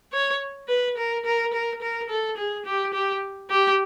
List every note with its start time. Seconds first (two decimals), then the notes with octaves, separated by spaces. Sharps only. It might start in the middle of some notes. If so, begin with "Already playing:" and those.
0.13 C#5
0.68 B4
0.97 A#4
1.25 A#4
1.53 A#4
1.81 A#4
2.10 A4
2.37 G#4
2.66 G4
2.93 G4
3.50 G4